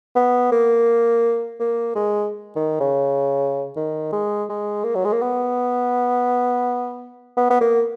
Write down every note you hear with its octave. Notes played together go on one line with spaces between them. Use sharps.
B3
A#3
A#3
G#3
D#3
C#3
D#3
G#3
G#3
A#3
F#3
G#3
A#3
B3
B3
B3
A#3